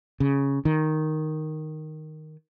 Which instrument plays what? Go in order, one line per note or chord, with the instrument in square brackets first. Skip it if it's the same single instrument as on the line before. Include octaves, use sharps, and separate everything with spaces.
[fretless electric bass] C#3
D#3